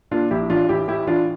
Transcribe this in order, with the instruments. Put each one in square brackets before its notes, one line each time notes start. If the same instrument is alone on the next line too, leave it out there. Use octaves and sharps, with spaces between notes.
[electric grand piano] A#2 D4 F4
A#1 E4 G4
A1 D4 F4
A1 E4 G4
A2 E4 G4
E3 D4 F4